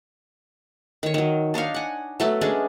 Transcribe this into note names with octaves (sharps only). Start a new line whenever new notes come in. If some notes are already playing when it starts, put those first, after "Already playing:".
D#3 C#5
D#3 F#3
D4 D#4 C#5 F5
F#5 G#5
F#3 A3 B3
G#3 C#4 D4 G#4